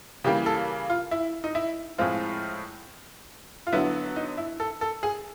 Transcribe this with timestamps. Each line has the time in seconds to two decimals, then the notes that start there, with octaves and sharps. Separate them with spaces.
0.24 C#3 E3 G3 A#3 G4
0.46 A4
0.90 F4
1.11 E4
1.44 D#4
1.55 E4
1.98 A2 F3 G#3 C4 F4
3.67 F4
3.72 D3 F#3 B3 E4
4.16 D#4
4.37 E4
4.60 A4
4.81 A4
5.03 G#4